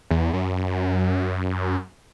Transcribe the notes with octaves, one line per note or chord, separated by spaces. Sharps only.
E2
F#2